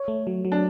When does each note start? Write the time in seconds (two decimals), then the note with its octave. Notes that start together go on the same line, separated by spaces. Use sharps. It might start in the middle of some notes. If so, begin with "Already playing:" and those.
Already playing: C#5
0.08 A3
0.27 F#3
0.45 F#3
0.52 D4